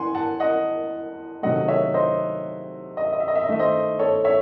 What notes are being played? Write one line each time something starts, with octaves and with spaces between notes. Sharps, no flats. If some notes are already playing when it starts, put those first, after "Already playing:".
Already playing: E3 F#5 G#5 C6
F#5 A5
D#5 F#5
C3 D#3 F#3 A3 D#5 F#5
C#5 E5
C5 D#5
D#5
E5
D#5
E5
D#5
E5
D#5
D#3 A3 E5
C5 D#5
A4 C#5
C#5 E5